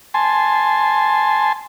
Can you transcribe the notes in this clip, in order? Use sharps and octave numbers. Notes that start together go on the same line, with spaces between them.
G#5 A5 C6